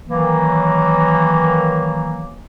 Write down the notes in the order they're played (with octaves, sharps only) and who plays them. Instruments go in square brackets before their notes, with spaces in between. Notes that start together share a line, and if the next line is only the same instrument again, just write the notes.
[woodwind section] D#3 E3 F#3 A#3